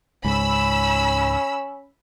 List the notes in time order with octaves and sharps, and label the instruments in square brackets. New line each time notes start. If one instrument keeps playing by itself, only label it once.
[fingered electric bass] C#2 G#2 [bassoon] C#4 [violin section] B5 E6